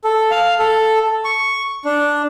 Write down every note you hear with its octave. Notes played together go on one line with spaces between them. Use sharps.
A4
F5
A4
C#6
D4